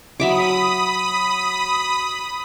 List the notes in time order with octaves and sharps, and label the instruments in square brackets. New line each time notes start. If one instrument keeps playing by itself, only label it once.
[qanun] F#3 E5 D6 [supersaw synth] B5 D#6